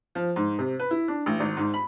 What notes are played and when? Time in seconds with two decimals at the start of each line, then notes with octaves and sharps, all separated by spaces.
0.15 F3
0.36 G#2
0.59 C3
0.79 B4
0.91 E4
1.08 D4
1.26 A1
1.40 G#1
1.57 G#2
1.74 B5